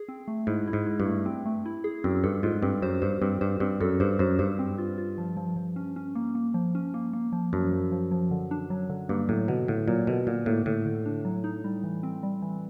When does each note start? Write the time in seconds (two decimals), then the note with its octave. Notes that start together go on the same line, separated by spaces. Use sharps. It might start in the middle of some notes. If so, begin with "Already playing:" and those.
Already playing: G#4
0.08 C4
0.28 A3
0.47 G#2 E4
0.67 E4
0.73 G#2
0.86 E4
1.00 G2
1.06 A3
1.26 C4
1.46 A3
1.65 E4
1.84 G#4
2.04 F#2 C4
2.23 G2 A4
2.43 G#2 F4
2.63 G2 C4
2.82 F#2 C5
3.02 G2 C5
3.22 G2 C4
3.41 G2 C5
3.60 G2 C4
3.81 F#2 A4
4.00 G2 C5
4.19 F#2 C5
4.39 G2 C5
4.59 C4
4.78 F4
4.98 F4
5.18 F3
5.37 F3
5.56 F3
5.76 C#4
5.96 C#4
6.15 A#3
6.35 A#3
6.54 F3
6.75 C#4
6.94 A#3
7.13 A#3
7.32 F3
7.53 F#2 F3
7.72 F3
7.92 F3
8.11 F3
8.31 D3
8.51 D4
8.70 F#3
8.89 D3
9.09 G2 A#3
9.29 A2 F#3
9.48 B2 D3
9.68 A2 D3
9.88 A#2 F#3
10.07 B2 D3
10.27 A#2 D3
10.46 A2 A#3
10.66 A2 D3
10.85 D3
11.05 D4
11.25 F#3
11.44 D#4
11.64 G3
11.84 E3
12.03 C4
12.23 G3
12.42 E3